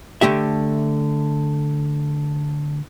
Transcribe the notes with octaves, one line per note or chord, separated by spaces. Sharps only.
D3 A3 G4 E5